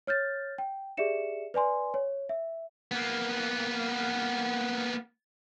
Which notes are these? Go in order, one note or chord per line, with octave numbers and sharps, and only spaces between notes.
C#5 F6 G6 A6
G5
G4 G#4 D5 E5 C#7 E7
B4 D5 G#5 C6
C#5
E5
A#3 B3